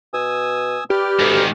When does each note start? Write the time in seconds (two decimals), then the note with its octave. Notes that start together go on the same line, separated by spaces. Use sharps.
0.14 B2 G#5 D#6 E6
0.90 G4 B4 D5 F6
1.20 D2 G#2 D#3